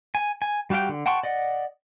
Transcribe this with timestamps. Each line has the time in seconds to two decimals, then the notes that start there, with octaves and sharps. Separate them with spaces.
0.15 G#5
0.42 G#5
0.70 G3 F#4 G4 F5 G5
0.89 D3
1.06 F#5 G5 A5 C6 C#6
1.23 D5 D#5 F#5